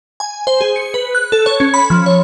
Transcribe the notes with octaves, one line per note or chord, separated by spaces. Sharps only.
G#5
C5
G#4
C#7
B4
F#6
A4
C#5
C#4
B5
F3
C#5